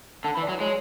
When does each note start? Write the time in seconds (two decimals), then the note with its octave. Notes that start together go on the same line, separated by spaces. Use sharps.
0.24 D3 A5
0.34 B5
0.37 E3
0.42 D5
0.49 F#3
0.60 G#3 C#5